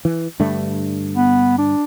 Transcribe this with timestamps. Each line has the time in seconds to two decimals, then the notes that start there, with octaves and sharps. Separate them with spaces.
0.05 E3
0.40 G2 D3 A3
1.15 B3
1.58 D4